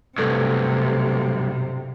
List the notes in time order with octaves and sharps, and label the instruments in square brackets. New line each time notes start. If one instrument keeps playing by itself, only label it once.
[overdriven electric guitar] B1 G2 [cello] C3 [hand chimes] A3 A4 E6